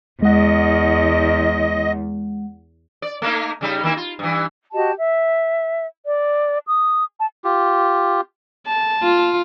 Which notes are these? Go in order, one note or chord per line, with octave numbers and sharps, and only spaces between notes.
E2 G#3 D#5 F#5
D5
A3 A#3 D#4
C#3 G3 D#4
D#3 A#3 E4
F4
G2 E3
F#4 G4 D#5 A5
E5
D5
D#6
A5
F4 G4
A5
F4